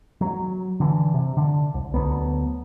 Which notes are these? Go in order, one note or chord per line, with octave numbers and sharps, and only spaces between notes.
F#3
D3 E3
C3
D3
C2
D2 F#3 B3